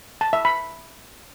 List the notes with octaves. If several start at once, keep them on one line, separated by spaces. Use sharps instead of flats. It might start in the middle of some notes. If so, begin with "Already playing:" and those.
A5
E5
B5